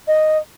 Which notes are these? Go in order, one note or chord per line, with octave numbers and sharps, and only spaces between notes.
D#5